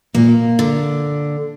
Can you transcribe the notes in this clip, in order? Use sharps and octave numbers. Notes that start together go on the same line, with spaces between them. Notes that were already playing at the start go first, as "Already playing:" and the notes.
A#2 A#3
D3